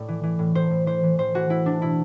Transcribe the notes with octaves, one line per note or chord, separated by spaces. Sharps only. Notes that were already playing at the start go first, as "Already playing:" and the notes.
Already playing: A2 D5
E3
E3
A2
A2 C5
A2
E3 C5
E3
A2 C5
E3 F#4
E3 E4
E3 D4
B2 E4